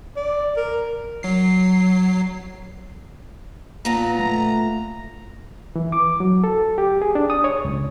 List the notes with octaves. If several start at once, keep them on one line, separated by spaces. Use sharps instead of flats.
D5
A#4
F#3 C7
A#2 B3 A#5
A3 F4 A#5
E3
D6
F#3
A4
G4
G#4
D4
D#6
C#5
C#2